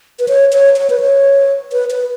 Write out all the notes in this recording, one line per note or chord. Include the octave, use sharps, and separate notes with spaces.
B4
C#5
C#5
C#5
B4
C#5
B4
B4